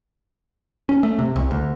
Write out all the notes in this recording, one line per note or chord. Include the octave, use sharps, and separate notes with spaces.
C#4
A3
C3
C2
D2